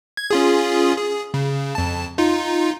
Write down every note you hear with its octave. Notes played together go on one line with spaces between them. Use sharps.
G#6
C#4 F4 G#4
G#4
C#3
F2 A5
D#4 F4